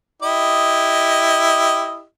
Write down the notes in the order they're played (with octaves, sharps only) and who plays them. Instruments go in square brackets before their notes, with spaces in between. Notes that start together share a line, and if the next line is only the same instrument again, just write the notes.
[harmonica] E4 G4 D#5